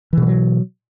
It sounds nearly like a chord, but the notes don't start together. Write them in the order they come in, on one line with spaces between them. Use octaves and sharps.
E3 B2 G3 F#3